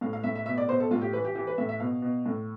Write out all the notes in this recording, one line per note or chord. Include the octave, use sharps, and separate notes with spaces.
A2 F5
F5
A2 E5
E5
B2 E5
D5
B2 C5
A4
A2 F4
G4
E3 B4
G4
E3 G4
B4
A2 E5
E5
B2 F5
B2
A2